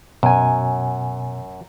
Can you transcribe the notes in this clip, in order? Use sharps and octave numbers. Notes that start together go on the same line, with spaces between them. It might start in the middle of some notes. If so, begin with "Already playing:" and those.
F#2 B2 G#5